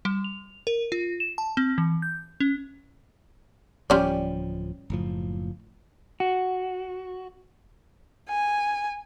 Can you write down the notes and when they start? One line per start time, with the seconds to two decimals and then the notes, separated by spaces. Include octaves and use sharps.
0.05 G3
0.24 F7
0.67 A#4
0.92 F4
1.20 E7
1.38 A5
1.57 C4
1.78 E3
2.02 G6
2.40 C#4
3.90 D1 F3 G3 C#4 D5
4.90 F#1 A2 F3
6.20 F#4
8.29 G#5